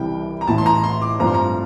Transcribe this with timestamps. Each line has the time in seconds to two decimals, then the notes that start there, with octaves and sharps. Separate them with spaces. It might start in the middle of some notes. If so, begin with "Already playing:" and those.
Already playing: C2 C3 E3 G3 G5
0.41 A#5
0.47 A1 A2 E3 A5
0.58 C6
0.66 A#5
0.84 C6
1.02 D6
1.19 G2 F3 A3 C4 F4 A#5
1.27 C6
1.34 A#5